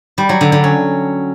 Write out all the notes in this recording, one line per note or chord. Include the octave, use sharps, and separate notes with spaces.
G3
F#3
D3
D3
C#4